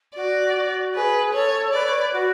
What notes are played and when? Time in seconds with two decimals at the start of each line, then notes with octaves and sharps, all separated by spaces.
0.15 F#4 D5
0.55 F#4
0.95 G#4 B4
1.33 A4 C#5
1.73 B4 D5
1.86 C#5
1.97 B4
2.13 F#4